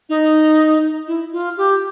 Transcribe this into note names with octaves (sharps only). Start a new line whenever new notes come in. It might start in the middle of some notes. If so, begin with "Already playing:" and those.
D#4
E4
F4
G4